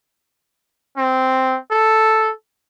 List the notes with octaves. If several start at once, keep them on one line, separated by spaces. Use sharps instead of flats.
C4
A4